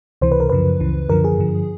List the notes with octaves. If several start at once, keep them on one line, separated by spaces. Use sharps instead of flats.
C#2 C3 E3 C5
B4
A#4
F#2 C#3 F3 B4
C#2 C#3 E3
F#2 D3 F3 A#4
G#4
G2 D3 F3